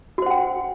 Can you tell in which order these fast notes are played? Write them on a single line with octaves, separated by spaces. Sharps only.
F#4 C5 F#5 G5